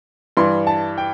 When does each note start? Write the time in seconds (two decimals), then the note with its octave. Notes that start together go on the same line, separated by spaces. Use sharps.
0.37 G2 E3 C6
0.67 A5
0.98 G5